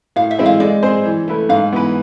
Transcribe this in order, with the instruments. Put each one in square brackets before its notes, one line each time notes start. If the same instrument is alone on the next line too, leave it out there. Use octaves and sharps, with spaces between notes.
[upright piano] A2 [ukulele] F5
[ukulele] E5
[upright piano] E3 G#3 C4 E4
[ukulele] F5
[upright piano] G#3 [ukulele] D5
[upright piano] C4 G#4 C5
E3
A3 E4 B4
[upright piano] G#2 [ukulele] F5
[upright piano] E3 B3 E4 B4